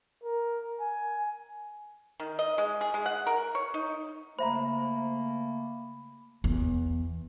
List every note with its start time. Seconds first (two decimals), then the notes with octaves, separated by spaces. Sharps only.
0.23 A#4
0.80 G#5
2.20 D#3
2.39 D#5
2.58 G#3
2.81 G#4
2.94 G#3
3.06 F#5
3.27 A#4
3.55 C#5
3.74 D#4
4.39 C#3 A3 A#3 C5 E5 A#5 B5
6.44 E2